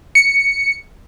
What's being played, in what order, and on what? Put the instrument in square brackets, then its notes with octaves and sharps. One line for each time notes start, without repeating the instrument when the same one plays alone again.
[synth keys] C#7